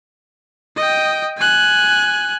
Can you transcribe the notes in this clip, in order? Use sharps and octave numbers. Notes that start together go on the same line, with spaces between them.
D#5 G5
G#5 F#6